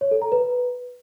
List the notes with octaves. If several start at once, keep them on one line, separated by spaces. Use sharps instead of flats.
C#5
A4
A#5
B4